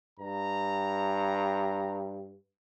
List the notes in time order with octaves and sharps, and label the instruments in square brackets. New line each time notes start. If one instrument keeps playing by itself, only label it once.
[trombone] G2 [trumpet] A#5